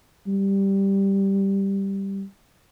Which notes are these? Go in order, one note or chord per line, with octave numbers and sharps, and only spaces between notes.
G3